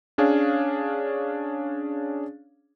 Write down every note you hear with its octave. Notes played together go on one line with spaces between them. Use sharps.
C#4 D4 G#4 C#5 F5